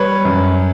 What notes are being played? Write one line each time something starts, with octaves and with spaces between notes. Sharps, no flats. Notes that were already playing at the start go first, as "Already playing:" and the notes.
Already playing: G3 B4 C#5
F#2